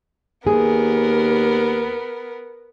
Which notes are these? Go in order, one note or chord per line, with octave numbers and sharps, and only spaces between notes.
D#2 B3 G#4 A#4